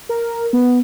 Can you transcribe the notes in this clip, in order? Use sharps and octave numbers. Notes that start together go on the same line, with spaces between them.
A#4
B3